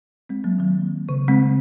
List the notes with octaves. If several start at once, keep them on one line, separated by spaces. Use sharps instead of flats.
G#3 C4
F#3 A#3
D#3 F#3
C#3
G#3 C4